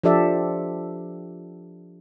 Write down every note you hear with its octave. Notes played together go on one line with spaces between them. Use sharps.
F3 D4 G4 A4 D5 E5